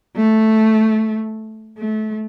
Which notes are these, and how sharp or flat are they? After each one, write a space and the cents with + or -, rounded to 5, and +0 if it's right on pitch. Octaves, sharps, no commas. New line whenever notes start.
A3 -5
A3 -25